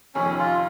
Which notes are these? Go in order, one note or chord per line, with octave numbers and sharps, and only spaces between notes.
F1 F2 C3 D#3 C#4
F4